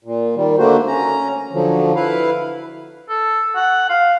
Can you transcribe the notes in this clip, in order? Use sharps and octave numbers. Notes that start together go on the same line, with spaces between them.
A#2
D#3 G3
D3 A3 A#3 D4 F#4 C5
C#4 A#5
D3 F3 F#3
E4 B4 F5
A4
F#5
F5